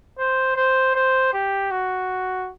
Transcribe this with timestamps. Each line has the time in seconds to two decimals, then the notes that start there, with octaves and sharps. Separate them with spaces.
0.19 C5
0.56 C5
0.95 C5
1.33 G4
1.71 F#4